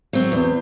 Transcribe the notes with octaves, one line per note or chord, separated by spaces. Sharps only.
F#3 C4
E2